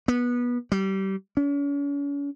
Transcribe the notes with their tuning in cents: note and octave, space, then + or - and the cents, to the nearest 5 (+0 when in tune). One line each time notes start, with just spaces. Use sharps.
B3 -20
G3 -25
C#4 +40